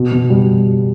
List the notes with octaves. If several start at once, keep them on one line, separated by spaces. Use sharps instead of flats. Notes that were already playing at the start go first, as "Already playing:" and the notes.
Already playing: B2
B2
G3